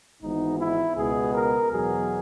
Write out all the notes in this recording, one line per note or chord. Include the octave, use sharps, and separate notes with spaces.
G#1 G#2 E3 B3 D#4
E4
C#2 B2 G#3 B3 G#4
A#4
E2 B2 F#3 B3 G#4